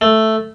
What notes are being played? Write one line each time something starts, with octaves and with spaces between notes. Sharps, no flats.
A3